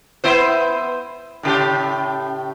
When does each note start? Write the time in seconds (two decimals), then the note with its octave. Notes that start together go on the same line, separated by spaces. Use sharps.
0.24 B3 E4 C5
1.43 A2 C#3 G4